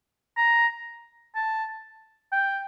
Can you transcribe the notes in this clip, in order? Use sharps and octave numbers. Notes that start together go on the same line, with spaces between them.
A#5
A5
G5